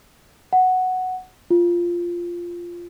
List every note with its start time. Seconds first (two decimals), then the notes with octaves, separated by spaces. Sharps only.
0.53 F#5
1.50 F4